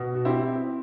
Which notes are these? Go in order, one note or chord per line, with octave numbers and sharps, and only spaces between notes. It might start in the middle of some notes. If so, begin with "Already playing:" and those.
Already playing: B2
F#4
C4 E4 G4